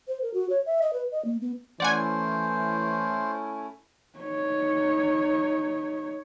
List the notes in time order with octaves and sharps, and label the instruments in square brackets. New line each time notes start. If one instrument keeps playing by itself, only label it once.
[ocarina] C5
A#4
F#4
C#5
E5
D#5
B4
D#5
A#3
B3
[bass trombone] E3 [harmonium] A3 C#4 E4 [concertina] C5 [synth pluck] D5 F#5 G#5
[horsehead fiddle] D#4 C#5